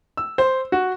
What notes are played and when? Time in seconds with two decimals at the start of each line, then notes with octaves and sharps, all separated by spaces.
0.17 E6
0.38 C5
0.72 F#4